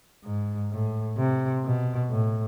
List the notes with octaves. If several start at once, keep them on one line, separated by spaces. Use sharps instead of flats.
G#2
A2
C3
B2
A2